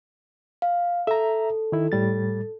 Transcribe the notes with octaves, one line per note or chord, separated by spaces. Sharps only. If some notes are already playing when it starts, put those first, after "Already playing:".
F5
A4 E5 A#5
D#3 E4
A2 G3 A6